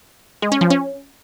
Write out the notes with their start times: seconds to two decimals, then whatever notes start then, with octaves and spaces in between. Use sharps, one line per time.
0.42 G#3
0.52 C#4
0.61 F3
0.70 C#4